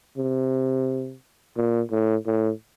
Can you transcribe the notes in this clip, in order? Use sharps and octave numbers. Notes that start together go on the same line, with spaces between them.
C3
A#2
A2
A2